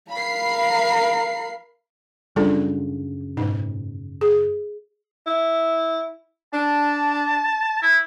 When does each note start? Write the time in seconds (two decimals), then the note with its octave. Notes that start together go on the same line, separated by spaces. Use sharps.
0.11 A#4 F5 B5 C7
2.36 F#2 C#3 G3 D4 F4 A4
3.37 G#2 B2 D#4
4.21 G#4
5.26 E4
6.53 D4 A5
7.82 E4